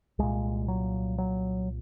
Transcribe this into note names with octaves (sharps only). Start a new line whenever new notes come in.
C2 A#2 G#3
F#3
F#3